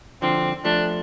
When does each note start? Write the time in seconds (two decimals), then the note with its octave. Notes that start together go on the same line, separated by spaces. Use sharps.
0.22 D3 F3 C4
0.65 F3 A3 D4